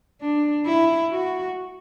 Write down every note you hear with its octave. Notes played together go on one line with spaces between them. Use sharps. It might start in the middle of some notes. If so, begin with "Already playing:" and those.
D4
E4
F#4